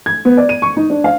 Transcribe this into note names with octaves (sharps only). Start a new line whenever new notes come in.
G#6
B3
D5
D#7
C#6
D#4
D4
F5